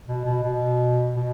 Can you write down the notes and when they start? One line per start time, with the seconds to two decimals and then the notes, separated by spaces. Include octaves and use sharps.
0.07 B2
0.25 B2
0.43 B2
1.15 B2